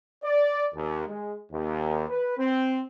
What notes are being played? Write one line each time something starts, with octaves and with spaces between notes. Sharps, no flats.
D5
D#2
G#3
D#2
B4
C4